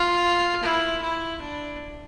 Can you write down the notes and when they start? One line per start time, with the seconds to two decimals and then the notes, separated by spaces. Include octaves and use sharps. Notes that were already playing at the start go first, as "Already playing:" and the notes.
Already playing: F4
0.63 E4
1.01 E4
1.41 D4